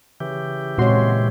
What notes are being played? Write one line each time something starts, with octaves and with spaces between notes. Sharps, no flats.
C#3 E3 G4
A#2 G#3 C4 F#4 C#5 C6